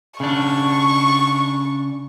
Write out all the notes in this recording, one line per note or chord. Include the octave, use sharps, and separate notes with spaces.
C#3 D4 C#6